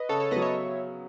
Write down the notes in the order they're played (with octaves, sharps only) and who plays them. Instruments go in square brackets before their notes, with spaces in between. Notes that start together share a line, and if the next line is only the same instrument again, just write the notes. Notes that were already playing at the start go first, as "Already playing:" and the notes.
Already playing: [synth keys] B4 D#5
[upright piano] C#3 [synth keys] A4 C#5
[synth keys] A4 C#5
[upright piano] B3 [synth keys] B4 D#5
[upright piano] F#3
[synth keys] C#5 E5